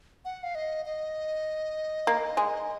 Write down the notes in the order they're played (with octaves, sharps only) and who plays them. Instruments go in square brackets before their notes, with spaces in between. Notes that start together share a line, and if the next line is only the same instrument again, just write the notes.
[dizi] F#5
F5
D#5
D#5
[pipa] A#3
G#3